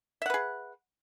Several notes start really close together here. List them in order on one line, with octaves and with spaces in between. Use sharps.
E5 F#5 B4 G#4